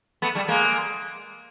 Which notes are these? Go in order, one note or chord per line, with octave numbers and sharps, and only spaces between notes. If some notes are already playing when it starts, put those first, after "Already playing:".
A3 B3
G3 A3
G#3 A#3